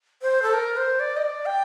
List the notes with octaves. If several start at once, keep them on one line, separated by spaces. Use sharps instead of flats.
C5
A4
A#4
C5
D5
D#5
D5
G5